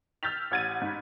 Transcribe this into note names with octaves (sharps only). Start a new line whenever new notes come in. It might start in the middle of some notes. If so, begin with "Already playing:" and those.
E6 F6 G6 A6 B6 F7
A1 F#5 G#6 A6 D#7
G#2 B5